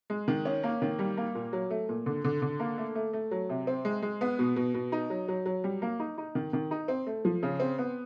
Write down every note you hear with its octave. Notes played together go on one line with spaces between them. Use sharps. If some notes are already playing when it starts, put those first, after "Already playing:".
G#3
D#3
C#4
A#3
D#3
G3
A#3
A#2
F#3
A3
A#2
D3
D3
D3
A#3
A3
A3
A3
F#3
C3
C4
G#3
G#3
B3
B2
B2
B2
D#4
F#3
F#3
F#3
G3
A#3
D#4
D#4
D#3
D#3
D#4
C4
A3
F3
C#3
C4
B3